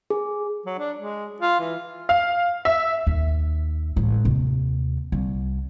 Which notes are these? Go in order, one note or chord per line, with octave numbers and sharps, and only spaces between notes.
G#4
F#3
D4
G#3
F4
E3
F5
E5
D#2
A1 G#3
D#2 C3
C2